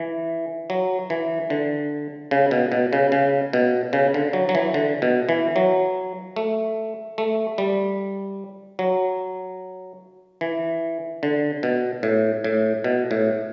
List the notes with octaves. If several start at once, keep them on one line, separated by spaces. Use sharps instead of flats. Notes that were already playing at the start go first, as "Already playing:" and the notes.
Already playing: E3
F#3
E3
D3
C#3
B2
B2
C#3
C#3
B2
C#3
D3
F#3
F#3
E3
D3
B2
E3
F#3
A3
A3
G3
F#3
E3
D3
B2
A2
A2
B2
A2